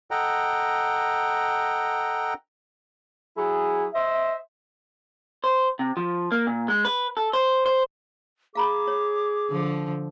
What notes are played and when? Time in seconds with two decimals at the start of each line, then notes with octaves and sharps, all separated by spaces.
0.11 A4 D#5 F#5 G5 A#5
3.36 F#3 E4 G#4
3.94 C5 D#5 E5
5.44 C5
5.79 C3
5.97 F3
6.32 A#3
6.47 A#2
6.68 G#3
6.85 B4
7.17 A4
7.33 C5
7.66 C5
8.55 G#4 F5 A#5 B5 D6
8.87 C#5
9.49 D3 F3